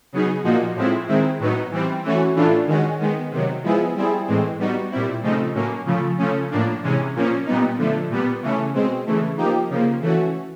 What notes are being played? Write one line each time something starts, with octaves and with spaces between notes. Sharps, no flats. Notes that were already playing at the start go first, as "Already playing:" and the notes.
C#3 F#3 B3 D#4 G#4
A#2 F3 A#3 D#4 F#4
A2 F3 G#3 C4 E4
D#3 G#3 C4 E4
A2 F#3 B3 D#4
E3 G3 C4
E3 A3 C#4 F#4
A2 E3 A3 D4 F4
D#3 G#3 C#4 F#4
D#3 G#3 B3
C3 D#3 F#3
F3 G#3 B3 E4 G#4
G3 C4 E4 G#4
A2 E3 G#3 C4
G3 B3 D#4 F#4
A#2 G3 C4 E4
C#3 F3 A3 C4 D#4
A2 F#3 A#3 C#4
C#3 F3 A3
C#3 F3 A3 C#4
A2 F3 A#3 D4
C3 E3 G#3 C#4
A#2 F3 A#3 C#4
A#2 G3 B3 D#4
D3 F3 A3
A#2 G3 B3
C#3 E3 A3 C#4
B2 G#3 C4
C#3 E3 A3
F3 A#3 D#4 G4
C#3 F3 A#3
E3 A3 C#4 F#4